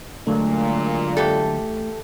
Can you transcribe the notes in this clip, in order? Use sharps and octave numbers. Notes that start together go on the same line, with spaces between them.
A#2 D3 F#3 G#3 A3
E3 G4 A4